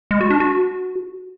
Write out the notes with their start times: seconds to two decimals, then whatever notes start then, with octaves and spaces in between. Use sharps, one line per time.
0.11 G#3
0.21 F#4
0.30 D4
0.40 F#4